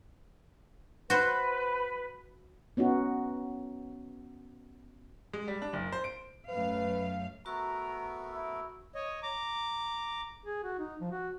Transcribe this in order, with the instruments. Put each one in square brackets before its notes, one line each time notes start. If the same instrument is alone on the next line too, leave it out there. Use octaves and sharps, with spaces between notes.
[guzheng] F#4 C5 [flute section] B4
[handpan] B3 C#4 D#4 F#4
[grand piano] G#3
G3
D4
F#1
C5
D7
[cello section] F#2 A3 F5 [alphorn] B4
[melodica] A3 B3 A#4 [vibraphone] F#4 C#6 E6 [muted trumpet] A#5
[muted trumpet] E4
[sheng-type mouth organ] C#5 D#5
A#5 D6
[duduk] G#4
F#4
D#4
F3
F#4